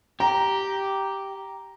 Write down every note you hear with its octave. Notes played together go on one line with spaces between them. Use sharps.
G4 A#5